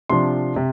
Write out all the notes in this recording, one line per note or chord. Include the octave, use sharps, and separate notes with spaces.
C3 F3 D4 C6
C3